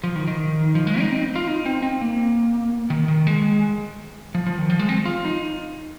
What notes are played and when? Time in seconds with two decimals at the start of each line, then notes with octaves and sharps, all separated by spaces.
0.04 F3
0.16 D#3
0.27 D#3
0.75 F3
0.87 G#3
1.00 D#4
1.11 C4
1.36 F4
1.47 D#4
1.66 C4
1.83 C4
2.01 A#3
2.90 D#3
3.08 D#3
3.27 G#3
4.35 F3
4.46 F3
4.58 D#3
4.70 F3
4.79 G#3
4.89 C4
5.05 F4
5.25 D#4